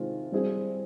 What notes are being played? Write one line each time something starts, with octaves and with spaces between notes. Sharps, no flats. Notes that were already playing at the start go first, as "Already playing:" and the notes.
Already playing: C3 D#3 G#3 C4 F4
G3 C4 E4 G#4